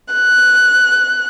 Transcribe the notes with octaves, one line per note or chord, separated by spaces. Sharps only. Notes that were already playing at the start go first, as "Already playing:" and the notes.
F#6